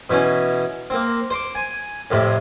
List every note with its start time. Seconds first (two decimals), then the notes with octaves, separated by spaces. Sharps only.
0.10 B2 E3 C#4
0.90 A#3 C4
1.30 C5 D6
1.55 G#5
2.11 F2 A2 C3